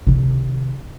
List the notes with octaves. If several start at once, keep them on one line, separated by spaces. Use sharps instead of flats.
C3 D#3